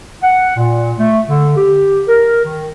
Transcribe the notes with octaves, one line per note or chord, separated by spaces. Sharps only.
F#5
A#2
A3
D3
G4
A#4
D#3